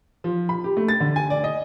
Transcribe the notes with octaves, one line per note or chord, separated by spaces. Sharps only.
F3
B5
G4
A3
A6
D3
G#5
D5
D#5